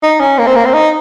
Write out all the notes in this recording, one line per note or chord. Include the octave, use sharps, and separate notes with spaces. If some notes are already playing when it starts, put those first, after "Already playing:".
D#4
C#4
A#3
C4
A#3
C4
D#4